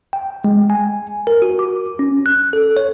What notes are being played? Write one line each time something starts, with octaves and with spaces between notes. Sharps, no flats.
G5
G#3
G#5
A#4
F#4
D6
C#4
F#6
A4
C#5